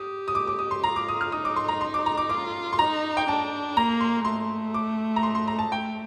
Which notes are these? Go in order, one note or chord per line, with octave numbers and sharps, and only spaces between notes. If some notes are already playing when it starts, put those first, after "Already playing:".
Already playing: G4 D#6
D#6
D6
D6
D#6
C6
F4 A#5
D6
D#6
F6
D#4 D#6
D6
C6
A#5
C6
D6
A#5
D6
F4 D6
C6
D#4 A#5
G5
D4 A5
A#3 A#5
C6
A3 C6
D6
A#5
C6
C6
A#5
A5
A3 G5